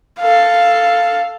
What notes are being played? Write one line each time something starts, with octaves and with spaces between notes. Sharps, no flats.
A4 F5